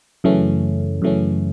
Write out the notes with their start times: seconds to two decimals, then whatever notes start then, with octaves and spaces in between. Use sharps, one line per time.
0.24 F#2 C#3 E3 A3 C#4
1.02 F#2 C#3 E3 A3 C#4